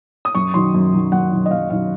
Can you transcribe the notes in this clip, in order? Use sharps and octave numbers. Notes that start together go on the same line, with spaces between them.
D#6
F#2 C#6
D#3 F#3 C6
F#2
D#3 F#3
F#2 F#5
D#3 F#3
D#5
F#2 F5
D#3 F#3 F5